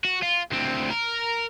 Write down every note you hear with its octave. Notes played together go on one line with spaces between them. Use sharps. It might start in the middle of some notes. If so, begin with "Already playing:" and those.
F#4
F4
D2 C4
A#4